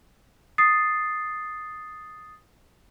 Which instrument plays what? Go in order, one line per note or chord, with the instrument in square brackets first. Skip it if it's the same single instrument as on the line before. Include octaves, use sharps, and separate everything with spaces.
[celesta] D#6 A6 C7